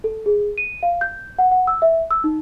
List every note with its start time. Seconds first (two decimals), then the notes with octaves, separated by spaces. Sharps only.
0.04 A4
0.26 G#4
0.58 D#7
0.83 F5
1.01 G6
1.38 F#5
1.51 F#5
1.67 E6
1.82 E5
2.11 E6
2.24 D#4